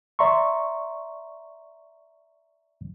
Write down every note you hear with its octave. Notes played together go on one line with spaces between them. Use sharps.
D5 E5 A#5 C6 C#6